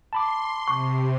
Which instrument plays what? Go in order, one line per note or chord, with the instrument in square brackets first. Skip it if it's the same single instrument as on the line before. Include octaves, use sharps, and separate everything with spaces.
[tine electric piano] A5 B5 D6 [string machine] C6
[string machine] C3 [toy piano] C#6